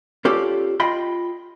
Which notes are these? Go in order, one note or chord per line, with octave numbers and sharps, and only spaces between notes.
C#4 F4 G4 A4 D5
F4 D#5 G5 B5 C6